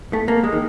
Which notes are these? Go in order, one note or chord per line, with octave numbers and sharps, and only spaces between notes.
A3
A#3
G#3
D#3